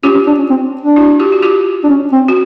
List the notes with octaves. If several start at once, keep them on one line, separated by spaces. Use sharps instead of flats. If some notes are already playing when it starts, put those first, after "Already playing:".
C#4 F4 G4
C#4
D4
C#4
C4
D4
E4 F#4
F4 G4
F#4
F4 G4
D4
C#4
C4
F#4